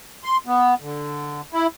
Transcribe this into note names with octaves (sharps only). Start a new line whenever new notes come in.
C6
B3
D3
E4